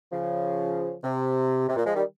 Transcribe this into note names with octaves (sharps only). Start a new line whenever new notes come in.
C#3 F3
C3
C3
A#2
F3 G#3
D#3 G3